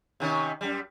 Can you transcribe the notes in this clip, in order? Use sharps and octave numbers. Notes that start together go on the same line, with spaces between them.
C3 D#3 C#4
F#2 G3